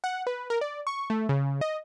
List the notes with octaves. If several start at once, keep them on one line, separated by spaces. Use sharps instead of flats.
F#5
B4
A#4
D5
C#6
A3
C#3
D#5